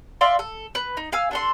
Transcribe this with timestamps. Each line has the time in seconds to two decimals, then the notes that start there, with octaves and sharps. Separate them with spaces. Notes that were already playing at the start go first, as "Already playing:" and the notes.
0.21 D5 E5 F5 C6
0.39 A4
0.75 B4
0.97 D#4
1.12 F5 G#5 E6
1.31 D4 A4 C6